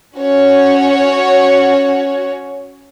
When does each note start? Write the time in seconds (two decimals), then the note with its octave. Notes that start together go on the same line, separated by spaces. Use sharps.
0.17 C#4 F#4 C#5